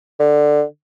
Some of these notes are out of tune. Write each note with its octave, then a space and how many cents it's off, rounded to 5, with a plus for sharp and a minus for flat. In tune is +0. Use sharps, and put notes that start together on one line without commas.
D3 +10